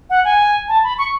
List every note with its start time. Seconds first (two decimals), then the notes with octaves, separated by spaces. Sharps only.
0.10 F#5
0.25 G#5
0.68 A5
0.83 B5
0.98 C#6